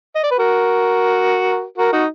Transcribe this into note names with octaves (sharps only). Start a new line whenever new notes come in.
D#5
D5
B4
F#4 A#4
F#4 A#4
D#4 F#4